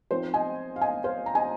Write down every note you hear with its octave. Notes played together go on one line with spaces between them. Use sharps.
F3 C4 D#4 C5
D#5 G#5
F5
D#5 G#5
C5 F5
A#5
D#5 G#5